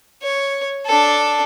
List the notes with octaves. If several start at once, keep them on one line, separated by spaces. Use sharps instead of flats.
C#5
D4 A4